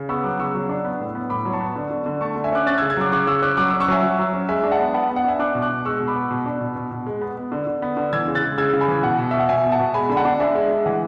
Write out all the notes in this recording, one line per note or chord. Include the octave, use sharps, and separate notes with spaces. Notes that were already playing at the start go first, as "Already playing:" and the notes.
Already playing: C#3
B3 C#6 E6
F#3 D6 F#6
C#3 C#6 E6
F#3
D4
B3
A2
B3
A2 B5 D6
F#3
A5 C#6
B3
D3
D3
D3
A3 A5 C#6
D3
E5 G#5
C#4 D6 F#6
C#4 F#6 A6
E6 G#6
C#3
E6 G#6
F#3 D6 F#6
C#3 D6 F#6
C#3 C#6 E6
C#4 D6 F#6
F#3 D6 F#6
C#6 E6
C#4
C#6 E6
F#3 E5 G#5
F#3
F#3
C#4
G#3 E5 G#5
D4
F#5 A5
B3
B3 F#5 A5
B3
F#5
D4 E5 G#5
D4 D6 F#6
B2
D6 F#6
B2
G#3 C#6 E6
B2
B5 D6
B3
B2
D4
B2
B2
B2
G#3
B3
B3
D3
D3
B3
D3
E3 E6 G#6
C#3
F#6 A6
G#3
C#3 E6 G#6
C#3
G#5 B5
E3
B2 F#5
B2
B2 E5
F#5
B2 E5 G#5
B2
F#5 A5
B2
G#3 G#5 B5
D3 B5
F#5 A5
D4
D4 E5 G#5
G#3
G#3
E3 F#5